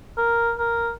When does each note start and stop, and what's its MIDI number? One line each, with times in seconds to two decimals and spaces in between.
0.18 0.53 70
0.59 0.91 70